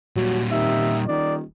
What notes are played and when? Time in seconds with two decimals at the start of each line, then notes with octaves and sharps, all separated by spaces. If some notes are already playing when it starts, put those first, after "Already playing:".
0.16 A#2 F#3 G3
0.51 C3 D#3 E5
1.08 D#1 D#3 D5